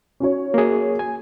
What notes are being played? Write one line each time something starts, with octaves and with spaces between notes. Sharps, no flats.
C#4 F#4 C#5
A#3 G#4
G#5